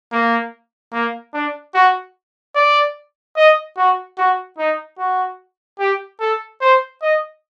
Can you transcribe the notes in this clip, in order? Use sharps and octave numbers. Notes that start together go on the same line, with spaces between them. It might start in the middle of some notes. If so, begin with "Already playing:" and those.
A#3
A#3
D4
F#4
D5
D#5
F#4
F#4
D#4
F#4
G4
A4
C5
D#5